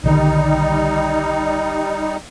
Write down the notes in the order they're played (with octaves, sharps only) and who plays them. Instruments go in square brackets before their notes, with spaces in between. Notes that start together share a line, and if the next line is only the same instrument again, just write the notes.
[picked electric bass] B1 D3 D#3 [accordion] G3 D#4